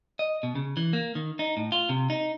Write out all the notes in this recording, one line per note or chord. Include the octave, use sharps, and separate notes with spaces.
D#5
B2
C#3
E3
A#3
D#3
D#4
A2
F4
C3
D#4